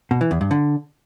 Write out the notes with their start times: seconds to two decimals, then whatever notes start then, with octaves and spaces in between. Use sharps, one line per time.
0.11 B2
0.21 E3
0.31 E2
0.41 G2
0.51 D3